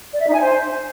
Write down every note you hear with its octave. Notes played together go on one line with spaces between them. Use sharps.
D5
E5
D#4
G#5
C5